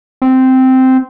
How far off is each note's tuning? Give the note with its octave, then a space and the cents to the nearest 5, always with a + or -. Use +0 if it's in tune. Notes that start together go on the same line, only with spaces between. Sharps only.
C4 -10